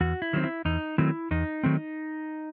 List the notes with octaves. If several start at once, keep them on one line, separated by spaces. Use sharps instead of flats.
E2 F#4
E4
D#3 F#3 A3 C4
E4
E2 D#4
D#3 F#3 A3 C4 E4
E2 D#4
D#3 F#3 A3 C4